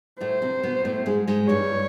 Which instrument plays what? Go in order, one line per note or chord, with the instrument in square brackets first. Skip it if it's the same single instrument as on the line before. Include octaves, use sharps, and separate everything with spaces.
[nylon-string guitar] A2 A3 [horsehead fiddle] C5
[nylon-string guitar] C3 C4
B2 B3
A2 A3
G#2 G#3
G#2 G#3
[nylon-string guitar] G2 G3 [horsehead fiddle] C#5